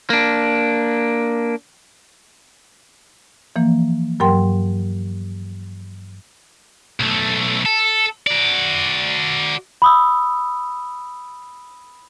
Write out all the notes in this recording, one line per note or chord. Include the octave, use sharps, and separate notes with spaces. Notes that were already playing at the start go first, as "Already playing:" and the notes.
A#3 D4
E3 F3 A#3
G2 F#3 A#4 G5 C6
B1 A3
A4
F#4 D5
B5 D#6 E6